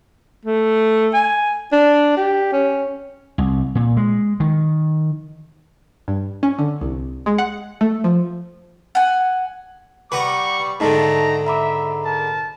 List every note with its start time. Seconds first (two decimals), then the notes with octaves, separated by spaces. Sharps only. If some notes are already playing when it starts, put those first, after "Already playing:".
0.45 A3
1.14 G#5
1.72 D4
2.17 G4
2.53 C#4
3.38 C2
3.75 A#2
3.97 G#3
4.40 D#3
6.08 G2
6.43 C#4
6.59 D3
6.81 C2
7.26 G#3
7.38 F#5
7.81 A3
8.04 F3
8.95 F#5 G#5
10.12 G3 B4 F#5 A#5 B5 C#6 D6
10.80 G#2 D3 D#3 A3 D#4 D#5 A5 A#5
11.46 E5 A#5 B5 D6
12.04 A#4 A5